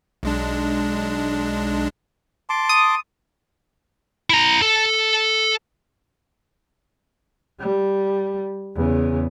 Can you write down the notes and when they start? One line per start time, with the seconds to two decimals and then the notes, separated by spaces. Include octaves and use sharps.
0.23 B1 G#3 D4
2.50 A5 C6 D6
2.69 D#6
4.30 E4 A#5
4.62 A4
7.60 G3
8.76 E2 C#3